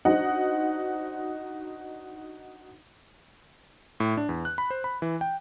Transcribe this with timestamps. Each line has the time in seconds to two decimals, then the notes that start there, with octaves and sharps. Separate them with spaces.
0.05 D4 D#4 F#4 C5 D#5 F#5
4.00 A2
4.17 D4
4.29 E2
4.45 F#6
4.58 B5
4.70 C5
4.84 B5
5.02 E3
5.21 G5